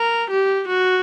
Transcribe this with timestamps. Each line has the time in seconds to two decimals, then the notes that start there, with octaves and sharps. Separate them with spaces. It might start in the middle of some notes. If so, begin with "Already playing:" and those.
Already playing: A#4
0.30 G4
0.67 F#4